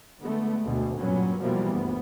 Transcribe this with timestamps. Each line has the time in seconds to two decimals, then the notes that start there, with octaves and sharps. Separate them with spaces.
0.22 D3 G#3 A3 B3
0.65 D2 B2
0.98 G2 A#2 F#3 G3 B3 C#4
1.41 B2 E3 F3 G3 A#3 B3
1.71 G1 D2 B3